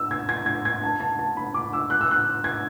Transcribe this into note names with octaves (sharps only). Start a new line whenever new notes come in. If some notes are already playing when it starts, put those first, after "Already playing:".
Already playing: E6
G#6
G#6
G#6
G#6
A5
A5
A5
B5
D6
E6
F#6
E6
F#6
G#6